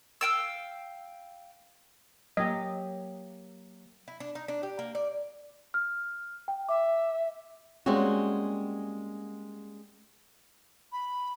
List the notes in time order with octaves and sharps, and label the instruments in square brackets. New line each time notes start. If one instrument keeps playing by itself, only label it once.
[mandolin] F5 G5 E6
[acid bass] F#3 [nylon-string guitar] A#3 G4 [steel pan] D#5
[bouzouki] E4
D4
D#4
D4
G4
A#3
D5
[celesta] F6
G5
[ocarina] E5 [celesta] D6
[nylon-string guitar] G3 G#3 A#3 C4 C#4 F#4
[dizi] B5